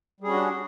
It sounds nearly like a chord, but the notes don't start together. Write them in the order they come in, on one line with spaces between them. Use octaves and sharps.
G3 G#4 C#4 F#4 D4